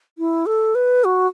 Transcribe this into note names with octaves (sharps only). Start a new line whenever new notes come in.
E4
A4
B4
F#4